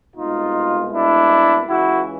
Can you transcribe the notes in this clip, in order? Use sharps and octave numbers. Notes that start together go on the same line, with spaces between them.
C2 B2 G#3 D#4 F4
D4 E4
C#2 C#3 E3 E4 F#4